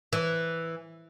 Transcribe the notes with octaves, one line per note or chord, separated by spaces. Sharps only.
E3